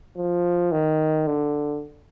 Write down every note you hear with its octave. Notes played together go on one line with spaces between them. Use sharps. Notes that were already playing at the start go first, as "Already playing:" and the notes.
F3
D#3
D3